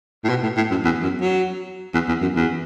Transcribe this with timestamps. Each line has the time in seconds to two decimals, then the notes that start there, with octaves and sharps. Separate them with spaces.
0.24 A2
0.29 B2
0.43 A2
0.57 A2
0.70 F#2
0.84 E2
1.02 F#2
1.21 F#3
1.94 E2
2.08 E2
2.22 F#2
2.35 E2